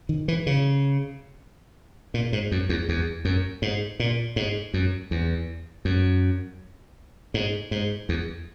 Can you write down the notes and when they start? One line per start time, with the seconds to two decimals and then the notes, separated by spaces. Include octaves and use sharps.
0.09 D#3
0.28 E3
0.47 C#3
2.14 A#2
2.33 G#2
2.52 F#2
2.69 E2
2.89 E2
3.25 F#2
3.62 G#2
4.00 A#2
4.36 G#2
4.74 F#2
5.11 E2
5.85 F#2
7.34 G#2
7.71 G#2
8.09 E2